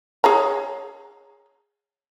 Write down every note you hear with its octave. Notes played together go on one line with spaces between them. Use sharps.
G#4 C#5 A#5